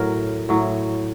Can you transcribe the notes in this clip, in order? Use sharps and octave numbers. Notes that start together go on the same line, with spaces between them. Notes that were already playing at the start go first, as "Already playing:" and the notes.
Already playing: A2 F#3 A#4
A2 F#3